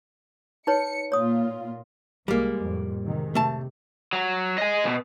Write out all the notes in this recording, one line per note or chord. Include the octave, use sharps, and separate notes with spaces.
D#4 B4 C#5 C#7
A#2 F4 C#5 D#6
C2 G3 G#3 A#3
F2 A2
C3 D#3 G#3
C3 A3 A5
F#3
D#5 G#5
D2 B2